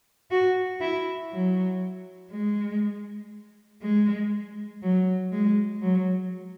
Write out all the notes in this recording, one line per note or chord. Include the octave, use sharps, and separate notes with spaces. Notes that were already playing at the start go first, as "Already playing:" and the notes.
F#4
E4
F#3
G#3
G#3
F#3
G#3
F#3